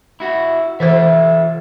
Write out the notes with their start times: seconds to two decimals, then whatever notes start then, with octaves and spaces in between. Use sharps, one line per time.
0.20 E4 F#4
0.80 E3 F4 A4 C5 E5